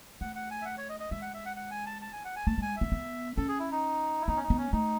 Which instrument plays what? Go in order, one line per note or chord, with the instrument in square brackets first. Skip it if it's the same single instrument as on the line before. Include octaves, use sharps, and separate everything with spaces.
[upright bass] A3 [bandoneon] F#5
[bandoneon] F#5
G#5
E5
F#5
C#5
D#5
D#5
[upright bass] G#3 [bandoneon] E5
[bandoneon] F#5
E5
F#5
F#5
G#5
A5
A5
G#5
F#5
G#5
[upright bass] A3 [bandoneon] A5
[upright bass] G#3 [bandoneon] G#5
[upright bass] B3 [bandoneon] E5
[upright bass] B3
[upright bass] C#4 [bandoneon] A4
[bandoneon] G#4
E4
D#4
E4
[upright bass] B3 [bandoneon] D#4
[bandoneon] C#4
D#4
[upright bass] B3
[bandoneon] C#4
[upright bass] A3 [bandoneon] D#4